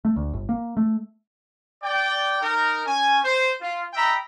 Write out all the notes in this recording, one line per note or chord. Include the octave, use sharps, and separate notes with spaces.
A3
D2
G1
A#3
A3
D5 G5
D#4 A#4
C#4 G#5
C5
F4
D#5 E5 G5 A#5 B5